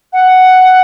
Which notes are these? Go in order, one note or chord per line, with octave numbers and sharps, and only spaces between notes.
F#5